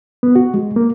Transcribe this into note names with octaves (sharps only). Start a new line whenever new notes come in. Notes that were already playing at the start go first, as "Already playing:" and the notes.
B3
F#4
G#3
A#3